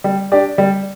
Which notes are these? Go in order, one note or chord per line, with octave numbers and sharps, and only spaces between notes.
G3
D4 G4 D5
G3